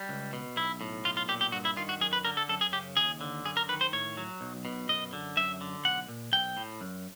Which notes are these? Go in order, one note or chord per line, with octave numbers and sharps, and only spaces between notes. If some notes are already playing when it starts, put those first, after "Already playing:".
Already playing: G3
C#2
B2
B1 E4
A2
B1 F4
F4
A#2 G4
G4
G2 F#4
E4
D#3 F4
F#4
F#2 G#4
B4
D3 A#4
A4
F#2 A4
G#4
C#3 G4
D#2 G#4
D3
F#2 G#4
A#4
D#3 B4
C5
A2 C#5
F#3
B1
B2
F#2 D#5
D3
F#2 E5
D3
B1 F#5
A#2
B1 G5
A2
F#2